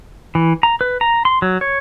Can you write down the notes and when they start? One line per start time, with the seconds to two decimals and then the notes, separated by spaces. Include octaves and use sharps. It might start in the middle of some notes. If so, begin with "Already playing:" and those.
0.35 E3
0.63 A#5
0.81 B4
1.01 A#5
1.25 C6
1.42 F#3
1.61 C#5